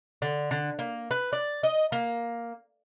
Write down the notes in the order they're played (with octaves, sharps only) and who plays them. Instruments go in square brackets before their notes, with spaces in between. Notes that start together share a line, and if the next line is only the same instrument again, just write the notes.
[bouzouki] D3
D3
A#3
B4
D5
D#5
A#3